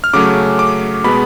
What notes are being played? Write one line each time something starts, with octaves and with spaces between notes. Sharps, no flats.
F6
C#3 F#3 A3 C#4 D6
D6
B2 G#3 B3 B5